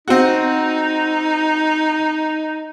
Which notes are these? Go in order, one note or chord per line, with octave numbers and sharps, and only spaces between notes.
C4 D#4 F#4